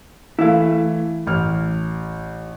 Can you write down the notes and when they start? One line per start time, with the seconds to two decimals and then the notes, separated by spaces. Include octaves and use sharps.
0.39 E3 A3 E4 F5
1.27 A1 F6